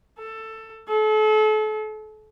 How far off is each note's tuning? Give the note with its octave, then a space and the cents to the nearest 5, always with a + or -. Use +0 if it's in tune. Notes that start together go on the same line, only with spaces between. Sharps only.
A4 +15
A4 -35